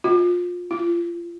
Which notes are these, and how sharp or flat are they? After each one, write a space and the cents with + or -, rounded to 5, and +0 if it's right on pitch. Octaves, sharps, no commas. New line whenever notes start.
F4 +25
F4 -30